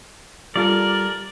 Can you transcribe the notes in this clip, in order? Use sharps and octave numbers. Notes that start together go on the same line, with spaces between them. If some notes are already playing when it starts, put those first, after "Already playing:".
G3 F4 A4 A#4 D5